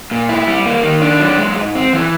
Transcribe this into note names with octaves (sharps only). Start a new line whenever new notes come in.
A#2
E4
G3
A#3
D#3
D4
F#3
G#3
G#2
C4
E3